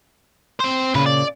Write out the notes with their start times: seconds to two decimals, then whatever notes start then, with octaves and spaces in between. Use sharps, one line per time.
0.60 C4 C5
0.94 D#2 A#2 C#3 B4
1.06 D5